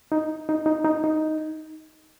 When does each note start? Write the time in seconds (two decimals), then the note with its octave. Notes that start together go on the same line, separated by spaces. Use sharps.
0.12 D#4
0.49 D#4
0.66 D#4
0.84 D#4
1.04 D#4